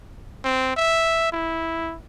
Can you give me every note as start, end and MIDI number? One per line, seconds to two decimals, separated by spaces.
0.44 0.75 60
0.76 1.32 76
1.32 1.96 64